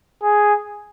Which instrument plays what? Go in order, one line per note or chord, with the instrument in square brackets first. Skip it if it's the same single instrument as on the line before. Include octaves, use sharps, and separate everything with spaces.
[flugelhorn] G#4